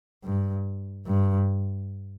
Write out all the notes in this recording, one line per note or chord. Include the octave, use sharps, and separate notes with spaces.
G2
G2